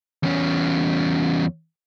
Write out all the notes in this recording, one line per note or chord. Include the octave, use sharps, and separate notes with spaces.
E2 C#4